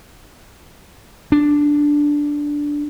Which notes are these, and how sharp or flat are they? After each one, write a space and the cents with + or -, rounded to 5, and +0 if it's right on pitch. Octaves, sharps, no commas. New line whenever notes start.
D4 -5